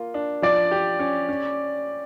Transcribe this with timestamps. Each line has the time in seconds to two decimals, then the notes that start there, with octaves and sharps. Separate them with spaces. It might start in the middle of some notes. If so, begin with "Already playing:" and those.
Already playing: A#3 F4
0.14 D4
0.42 F3 D5
0.71 G4
0.99 C#4
1.28 C#4